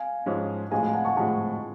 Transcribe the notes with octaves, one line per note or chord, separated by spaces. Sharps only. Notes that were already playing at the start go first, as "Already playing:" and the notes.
Already playing: F5 G#5
G#2 F3 G#3 C#4
A2 F3 G#3 F5 G#5
F5 G#5
F#5 A5
A5 C#6
A2 F3 G#3 A5 C#6